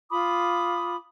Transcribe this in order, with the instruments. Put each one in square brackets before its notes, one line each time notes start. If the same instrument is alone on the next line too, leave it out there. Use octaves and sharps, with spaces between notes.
[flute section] F4 B5 D6 D#6